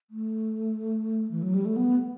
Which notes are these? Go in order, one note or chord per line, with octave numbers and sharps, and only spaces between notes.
A3
E3
F#3
G3
A3
B3